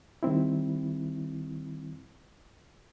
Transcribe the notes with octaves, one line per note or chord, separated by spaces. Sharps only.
D#3 G3 C4 E4